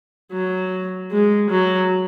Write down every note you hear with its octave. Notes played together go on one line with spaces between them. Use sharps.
F#3
G#3
F#3